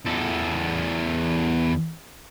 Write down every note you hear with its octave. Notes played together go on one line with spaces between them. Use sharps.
E2 A4